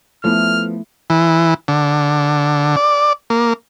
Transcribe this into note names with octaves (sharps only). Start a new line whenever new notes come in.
F3 A3 B3 E4 F6
E3
D3
D5
A#3